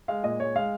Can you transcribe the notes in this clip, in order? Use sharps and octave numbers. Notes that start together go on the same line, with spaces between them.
G#3 F5
A#2 D#5
G#3 C#5
G#3 F5